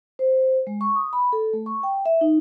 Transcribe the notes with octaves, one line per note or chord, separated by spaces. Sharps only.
C5
G#3
C#6
D#6
B5
A4
A3
C#6
G5
E5
D#4